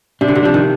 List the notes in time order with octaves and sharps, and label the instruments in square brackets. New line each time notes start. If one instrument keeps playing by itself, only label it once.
[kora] C3 [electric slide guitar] D4
[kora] D3
C3
[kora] F3 [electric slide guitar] D4
[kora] D#3